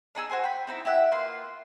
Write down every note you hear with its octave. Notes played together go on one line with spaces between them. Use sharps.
D4 D#4 G#4 E6
F#4 C5 G#5 C6
G5 B5
C4 D#4 E4
E4 G4 E5 F#5
A#3 F4 B4 C6